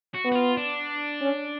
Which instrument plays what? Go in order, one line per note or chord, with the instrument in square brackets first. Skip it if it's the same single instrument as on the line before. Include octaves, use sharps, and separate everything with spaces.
[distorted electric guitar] F#4
[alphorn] B3
[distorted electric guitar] F#4
F4
D4
[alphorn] C#4